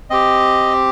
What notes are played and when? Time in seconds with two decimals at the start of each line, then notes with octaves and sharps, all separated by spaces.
0.10 C4 G4 D#5